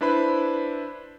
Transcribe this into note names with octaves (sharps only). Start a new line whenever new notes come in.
D4 E4 B4 C5 B5